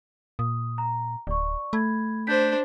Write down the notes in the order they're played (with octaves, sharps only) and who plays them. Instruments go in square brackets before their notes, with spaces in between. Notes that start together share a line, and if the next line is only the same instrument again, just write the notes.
[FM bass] A#2 [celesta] D#6
[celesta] A#5
[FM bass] D1 [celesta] D5 C#6
[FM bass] A3 [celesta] B5 G#6
[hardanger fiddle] D4 C5 [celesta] G6 B6